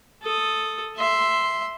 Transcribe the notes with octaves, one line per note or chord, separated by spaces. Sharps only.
A4 D#6
E5 C6